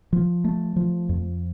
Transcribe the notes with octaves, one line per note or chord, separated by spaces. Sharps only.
F3
A3
F3
F2